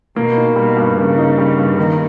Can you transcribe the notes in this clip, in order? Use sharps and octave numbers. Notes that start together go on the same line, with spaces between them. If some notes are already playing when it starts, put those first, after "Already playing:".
B2 A#3
D#4
B2 G3
G2
C#3 A#3
D#4
G3
G2
D#3 A#3